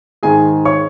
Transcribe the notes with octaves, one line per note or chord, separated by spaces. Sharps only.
G#2 D#3 G#3 G#4 G#5
C#5 C#6